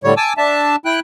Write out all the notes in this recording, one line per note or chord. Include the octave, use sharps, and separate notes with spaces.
A2 D3 G3 C#5
G#5 A5 D6 E6
D4 E5 A5
E4 G5 F#6